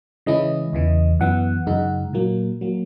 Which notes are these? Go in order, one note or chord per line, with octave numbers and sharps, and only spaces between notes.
C#3 E3 G#3 C#4 E4 D#5
E2 C#3 E3
F#2 E3 B3 F#5
F#2 C#3 G#3 D#4
A#2 F#3 A#3
F#3 A#3